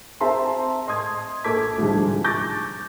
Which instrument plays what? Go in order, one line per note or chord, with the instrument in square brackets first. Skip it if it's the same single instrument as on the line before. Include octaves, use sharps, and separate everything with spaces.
[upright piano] C4 G#4 E5 A5 A#5 C6
D#5 C6 D#6 G#6
A#1 A4 A5 D6 G#6 B6
C2 G#2 D3 F3 G3 G#3
C#6 D6 G6 A6 A#6